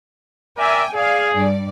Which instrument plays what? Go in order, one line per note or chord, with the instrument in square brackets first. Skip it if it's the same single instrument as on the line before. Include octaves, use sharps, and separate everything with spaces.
[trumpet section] A#4 D5 E5 [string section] G5 G#5
[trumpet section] G#4 [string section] D5 F5
[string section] G2 D5